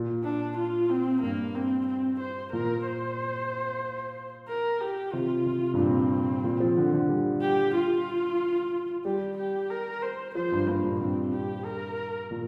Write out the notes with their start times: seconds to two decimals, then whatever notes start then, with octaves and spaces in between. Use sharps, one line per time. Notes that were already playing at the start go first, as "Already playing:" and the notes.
Already playing: A#2
0.24 D4
0.58 F4
0.90 C4
1.22 G2 A#3
1.55 C4
1.87 C4
2.20 C5
2.53 A#2 A#4
2.86 C5
4.48 A#4
4.81 G4
5.13 C3 F4
5.46 C3
5.74 G2
5.78 A#2 C4
6.44 A#2
6.60 F3
6.77 D3
6.93 D3
7.09 G3
7.41 G4
7.75 F4
9.05 G3 G4
9.38 G4
9.70 A#4
10.02 C5
10.35 F3 C5
10.52 G2
10.67 G2 A#3
10.84 A#2
11.00 G2 C4
11.32 G4
11.65 A#4
12.31 A#2